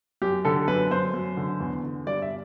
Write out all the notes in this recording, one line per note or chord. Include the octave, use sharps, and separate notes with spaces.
F#2 G4
D3 A4
F#2 B4
F#2 C5
F#2
D3
E2
D3
G2 D5
E5